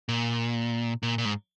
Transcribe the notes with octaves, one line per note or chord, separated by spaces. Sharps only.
A#2
A#2
A#2
G#2